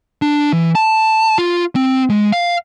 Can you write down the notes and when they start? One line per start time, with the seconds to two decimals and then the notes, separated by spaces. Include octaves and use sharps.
0.22 D4
0.53 E3
0.75 A5
1.38 F4
1.75 C4
2.10 G#3
2.32 F5